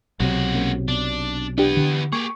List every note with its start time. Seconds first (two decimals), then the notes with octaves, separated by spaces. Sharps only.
0.20 B1 C3 F#3 G#3 F#4
0.55 A#3 C#4
0.88 B2 D4
1.58 E3 B3 D4 G4
1.77 D3
2.13 A#3 G4 G#4 C#6